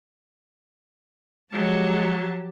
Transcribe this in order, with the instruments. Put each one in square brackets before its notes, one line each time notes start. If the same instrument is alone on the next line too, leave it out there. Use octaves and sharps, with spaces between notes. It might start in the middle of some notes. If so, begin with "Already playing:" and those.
[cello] F3 G4 [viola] F#3 A5 [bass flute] G#3